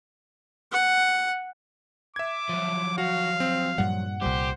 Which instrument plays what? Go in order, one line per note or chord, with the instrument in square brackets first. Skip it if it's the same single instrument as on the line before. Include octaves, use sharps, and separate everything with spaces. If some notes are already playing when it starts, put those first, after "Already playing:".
[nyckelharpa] F#5
[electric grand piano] E5 G#6 [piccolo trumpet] D6
[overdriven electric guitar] F3 F#3
[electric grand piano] F#4 [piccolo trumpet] F5
[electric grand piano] C4
[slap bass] G2 A#2 G3 [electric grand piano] F#5
[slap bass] C2 A#2 G3 [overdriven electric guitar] G4 [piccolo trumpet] C5